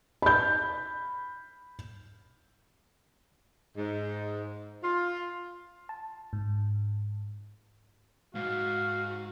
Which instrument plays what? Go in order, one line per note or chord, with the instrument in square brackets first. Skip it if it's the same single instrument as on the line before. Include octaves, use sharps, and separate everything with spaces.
[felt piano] B5 G6
[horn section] G#2
F4
[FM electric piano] A5
G#2
[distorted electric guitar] G#2 [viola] F#4 [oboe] F5